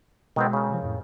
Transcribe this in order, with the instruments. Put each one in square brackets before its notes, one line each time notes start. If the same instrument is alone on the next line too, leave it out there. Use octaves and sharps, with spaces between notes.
[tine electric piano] B2 G#3 [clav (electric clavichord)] D#3 B3 C4
[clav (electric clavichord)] C#3 A#4
[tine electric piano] C3 F3
F2 A2